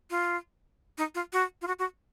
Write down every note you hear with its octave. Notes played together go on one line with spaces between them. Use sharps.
F4
D#4
F4
F#4
F4
F#4
F#4